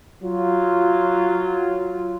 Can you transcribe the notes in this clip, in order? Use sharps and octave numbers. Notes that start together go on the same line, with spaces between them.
F#3 F4